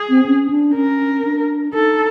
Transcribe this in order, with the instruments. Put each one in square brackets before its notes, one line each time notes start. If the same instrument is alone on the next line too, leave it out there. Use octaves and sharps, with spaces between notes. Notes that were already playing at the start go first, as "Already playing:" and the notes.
Already playing: [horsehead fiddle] G#4
[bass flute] C4
C#4
D4
[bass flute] C#4 [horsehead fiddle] A#4
[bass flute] D4
[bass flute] D#4 [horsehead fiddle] A4